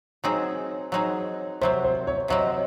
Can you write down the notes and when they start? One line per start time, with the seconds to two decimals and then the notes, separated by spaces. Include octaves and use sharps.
0.24 F#3 C4 D#4 G#4
0.92 F#3 C4 D#4 G#4
1.61 C3 F#3 C4 C5
1.84 C5
2.07 C#5
2.28 C3 F#3 C4 D#5